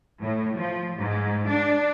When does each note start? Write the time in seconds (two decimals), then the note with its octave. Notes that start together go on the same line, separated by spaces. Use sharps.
0.20 A2
0.57 F3
0.98 G#2
1.48 D4